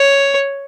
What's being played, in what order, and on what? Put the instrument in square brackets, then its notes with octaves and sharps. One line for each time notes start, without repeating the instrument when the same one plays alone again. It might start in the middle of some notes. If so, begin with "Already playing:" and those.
Already playing: [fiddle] C#5